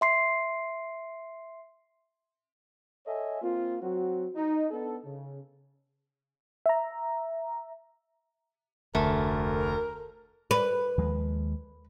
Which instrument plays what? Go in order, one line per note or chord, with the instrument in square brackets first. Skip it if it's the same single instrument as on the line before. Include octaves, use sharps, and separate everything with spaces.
[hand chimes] E5 C6 C7
[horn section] A4 C#5 D#5 E5 G#5
A#3 C4 F4
F#3 C4 F#4
D#4
B3 D4 A4
C#3
[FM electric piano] E5 A#5
[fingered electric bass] F1 [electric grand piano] D2 [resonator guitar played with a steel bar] A3 [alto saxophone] A#4
[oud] B4
[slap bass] D#2 F3 G#3